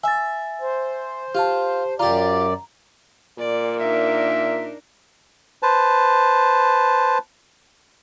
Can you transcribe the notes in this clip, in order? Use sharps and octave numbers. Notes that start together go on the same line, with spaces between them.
E5 G#5 A6
C5
F4 G4 A5
F#2 F4 G4 D5 A#5
A#2 D5
D4 D#4 A#4 E5
B4 C5 A5